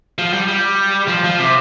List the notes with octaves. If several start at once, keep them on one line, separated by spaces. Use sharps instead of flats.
F3
G3
G3
F3
F3
C3